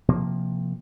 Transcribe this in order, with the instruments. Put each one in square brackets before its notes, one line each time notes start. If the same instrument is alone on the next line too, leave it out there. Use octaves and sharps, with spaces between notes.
[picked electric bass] C3 F3 A#3